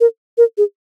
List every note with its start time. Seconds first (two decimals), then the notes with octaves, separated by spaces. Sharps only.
0.01 A#4
0.38 A#4
0.58 G#4